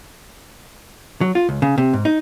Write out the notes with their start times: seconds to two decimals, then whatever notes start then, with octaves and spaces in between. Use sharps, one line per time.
1.21 F#3
1.35 F4
1.49 C#2
1.62 C#3
1.78 C3
1.93 G#2
2.05 D#4